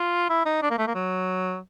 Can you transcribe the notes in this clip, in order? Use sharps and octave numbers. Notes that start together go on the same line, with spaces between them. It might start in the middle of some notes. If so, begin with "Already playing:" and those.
Already playing: F4
E4
D#4
D4
A#3
A3
A#3
F#3